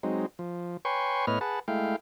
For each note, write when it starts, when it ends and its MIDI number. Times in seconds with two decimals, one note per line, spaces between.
0.03 0.26 54
0.03 0.26 56
0.03 0.26 60
0.03 0.26 63
0.39 0.77 53
0.85 1.26 71
0.85 1.26 73
0.85 1.26 79
0.85 1.26 80
0.85 1.26 84
0.85 1.26 85
1.27 1.39 45
1.27 1.39 59
1.27 1.39 71
1.27 1.39 73
1.27 1.39 75
1.27 1.39 89
1.41 1.59 68
1.41 1.59 71
1.41 1.59 78
1.41 1.59 81
1.68 1.96 56
1.68 1.96 57
1.68 1.96 64
1.68 1.96 77
1.68 1.96 79